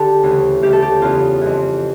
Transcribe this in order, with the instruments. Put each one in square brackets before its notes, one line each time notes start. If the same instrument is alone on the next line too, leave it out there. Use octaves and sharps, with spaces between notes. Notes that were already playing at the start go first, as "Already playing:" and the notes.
Already playing: [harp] D3 G4 A4
D2 C#3 E3
D2 C#3 E3 G4
A4
G4
E2 C#3 E3 F4
F2 E3